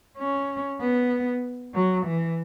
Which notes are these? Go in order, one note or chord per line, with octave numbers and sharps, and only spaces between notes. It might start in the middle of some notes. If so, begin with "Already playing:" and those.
C#4
B3
F#3
E3